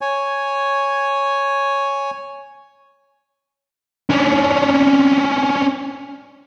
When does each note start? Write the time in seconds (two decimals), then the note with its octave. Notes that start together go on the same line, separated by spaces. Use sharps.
0.01 C#5 G#5
4.10 C#4 D4